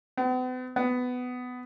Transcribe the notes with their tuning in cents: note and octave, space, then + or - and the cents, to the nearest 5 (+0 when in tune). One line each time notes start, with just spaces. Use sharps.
B3 +45
B3 +15